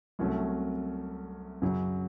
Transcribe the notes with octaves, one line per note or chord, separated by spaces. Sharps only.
C2 C3 F#3 A3 C#4
F#2 C#3 F#3